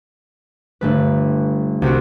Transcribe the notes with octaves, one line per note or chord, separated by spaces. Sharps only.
G1 A3 B4
C2 C4 F#4